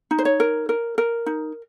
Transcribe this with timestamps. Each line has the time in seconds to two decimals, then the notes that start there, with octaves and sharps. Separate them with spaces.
0.11 D#4
0.18 C5
0.25 C#5
0.40 A#4
0.69 A#4
0.98 A#4
1.26 D#4